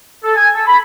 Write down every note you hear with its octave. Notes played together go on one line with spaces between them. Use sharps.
A4
G#5
A4
B5